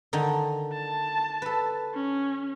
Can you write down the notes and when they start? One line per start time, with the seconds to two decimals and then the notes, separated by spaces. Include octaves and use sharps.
0.13 D3 D#3 D#4
0.73 A5
1.42 A4 B4
1.95 C#4